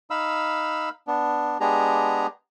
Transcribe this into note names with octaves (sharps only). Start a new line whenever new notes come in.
D#4 F5 B5 E6
B3 D4
G#3 B3 D4 G4 G#4 A#5